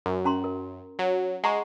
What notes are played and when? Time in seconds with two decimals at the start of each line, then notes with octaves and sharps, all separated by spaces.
0.06 F#2
0.25 C#4 A#5 C6
0.44 A#4
0.99 F#3
1.44 G#3 F#5 A#5 C#6